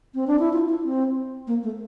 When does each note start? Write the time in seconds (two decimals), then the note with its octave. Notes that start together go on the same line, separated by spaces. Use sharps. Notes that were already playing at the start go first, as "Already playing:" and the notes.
0.15 C4
0.27 D4
0.39 E4
0.53 F4
0.68 E4
0.84 C4
1.47 A#3
1.63 A3